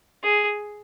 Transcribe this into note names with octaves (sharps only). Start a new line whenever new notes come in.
G#4